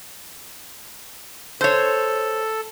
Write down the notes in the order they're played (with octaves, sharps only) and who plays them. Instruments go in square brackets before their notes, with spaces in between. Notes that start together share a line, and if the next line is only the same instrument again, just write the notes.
[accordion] A4 [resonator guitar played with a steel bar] C5 C#5